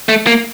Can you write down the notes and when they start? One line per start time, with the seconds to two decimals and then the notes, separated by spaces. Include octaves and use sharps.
0.09 A3
0.27 A#3